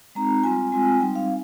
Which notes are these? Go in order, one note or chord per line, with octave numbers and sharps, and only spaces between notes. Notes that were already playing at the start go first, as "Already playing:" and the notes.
G#3 C4 D#4 A#5
G3 C4 F4 G#5
G#3 C4 F4 G#5
G3 C4 D#4 G5
F5